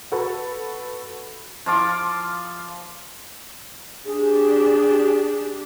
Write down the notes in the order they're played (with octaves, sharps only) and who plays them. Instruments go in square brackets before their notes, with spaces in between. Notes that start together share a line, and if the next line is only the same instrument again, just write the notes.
[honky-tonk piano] F#4 A4 B4
[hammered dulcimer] F3 F4 D6
[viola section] D4 G4 [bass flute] G#4